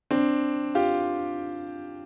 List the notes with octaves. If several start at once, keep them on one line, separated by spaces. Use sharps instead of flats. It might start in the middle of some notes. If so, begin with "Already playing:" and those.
C4 D4
F4 G4